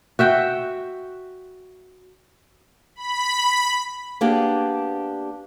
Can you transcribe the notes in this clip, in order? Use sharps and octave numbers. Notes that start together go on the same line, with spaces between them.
F#4 E5 G5
B5
A#3 B3 D4 G4 G#4